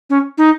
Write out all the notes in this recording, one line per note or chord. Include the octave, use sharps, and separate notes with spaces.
C#4
D#4